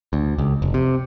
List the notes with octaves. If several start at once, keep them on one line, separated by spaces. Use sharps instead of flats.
D2
C#2
F1
C3